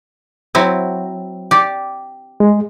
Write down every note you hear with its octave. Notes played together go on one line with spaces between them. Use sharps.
F#3 C4 E4
G4 D5
G#3